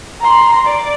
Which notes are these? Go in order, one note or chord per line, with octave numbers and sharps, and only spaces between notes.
A#5 C6
D5